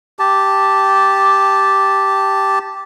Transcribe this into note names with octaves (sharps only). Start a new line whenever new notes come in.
G4 A5